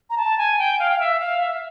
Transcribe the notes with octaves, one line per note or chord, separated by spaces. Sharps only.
A#5
A5
G#5
G5
F5
F5
E5
F5
E5